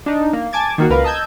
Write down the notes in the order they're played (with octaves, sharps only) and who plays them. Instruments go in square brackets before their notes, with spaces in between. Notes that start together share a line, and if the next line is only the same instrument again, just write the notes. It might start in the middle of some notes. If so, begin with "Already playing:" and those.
[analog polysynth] D4 D#4
A#3
G#5 A5 D6 G#6 A6
D#3 A#3 F#4
C#2 A#4 B4 F5
D#5 A5 E6 G6 G#6